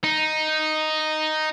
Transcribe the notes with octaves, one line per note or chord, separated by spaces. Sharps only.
D#4